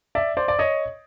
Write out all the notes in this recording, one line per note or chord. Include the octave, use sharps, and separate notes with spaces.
D5 E5
C5 D5
D5
C#5 D#5